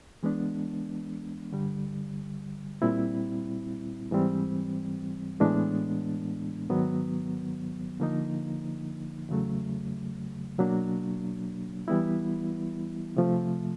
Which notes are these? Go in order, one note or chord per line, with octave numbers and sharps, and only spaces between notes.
E3 G#3 B3 D4
G2 D3 G3
A#2 G3 C4 E4
G#2 E3 G3 C4
A2 E3 G#3 B3 D4
G#2 D#3 F#3 B3
D3 F3 A#3 D#4
E2 C#3 F#3 A3
B2 F#3 A#3 D4
E3 G3 B3 E4
C3 F3 A3